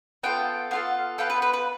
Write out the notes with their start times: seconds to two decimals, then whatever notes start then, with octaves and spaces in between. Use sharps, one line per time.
0.23 B3 F4 A4 G5
0.71 B3 F4 A4 F5
1.18 B3 F4 A4 G5
1.30 B4
1.42 B4
1.53 B4